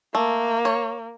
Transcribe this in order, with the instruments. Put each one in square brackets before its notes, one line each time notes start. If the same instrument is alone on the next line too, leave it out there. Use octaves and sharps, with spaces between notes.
[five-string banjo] A3 [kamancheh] A#3
[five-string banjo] C#5